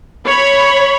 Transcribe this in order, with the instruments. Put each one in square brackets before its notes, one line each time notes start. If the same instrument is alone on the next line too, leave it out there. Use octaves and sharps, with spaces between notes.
[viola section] C#5 B5